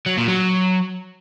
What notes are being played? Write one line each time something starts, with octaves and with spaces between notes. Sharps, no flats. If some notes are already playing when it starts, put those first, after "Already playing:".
F#3
A#2
F#3